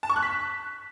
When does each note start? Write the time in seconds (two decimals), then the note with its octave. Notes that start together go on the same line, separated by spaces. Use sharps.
0.03 A5
0.10 C#6
0.16 F#6
0.23 B6